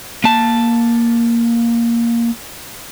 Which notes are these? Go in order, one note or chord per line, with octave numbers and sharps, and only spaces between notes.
A#3 A5